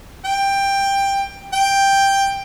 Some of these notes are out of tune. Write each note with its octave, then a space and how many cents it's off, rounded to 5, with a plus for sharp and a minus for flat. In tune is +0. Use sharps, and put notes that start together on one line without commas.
G5 +15
G5 +10